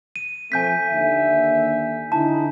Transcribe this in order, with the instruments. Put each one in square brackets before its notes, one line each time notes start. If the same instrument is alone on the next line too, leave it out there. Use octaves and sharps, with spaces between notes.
[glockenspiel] D#7
[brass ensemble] F3 A3 C4 [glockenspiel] G#5 G6 B6
[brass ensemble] D#2 D3 E5
[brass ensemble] D3 D#4 E4 [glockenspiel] A5